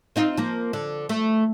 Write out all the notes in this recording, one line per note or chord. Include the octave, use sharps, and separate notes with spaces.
C4 D#4 F4
F3 A#3
D3
A3